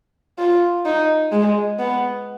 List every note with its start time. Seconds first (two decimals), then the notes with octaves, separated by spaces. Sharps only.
0.39 F4
0.86 D#4
1.32 G#3
1.79 B3